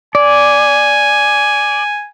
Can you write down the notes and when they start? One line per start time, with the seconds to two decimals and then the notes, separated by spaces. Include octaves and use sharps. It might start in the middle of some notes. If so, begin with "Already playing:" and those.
0.15 D5 G#5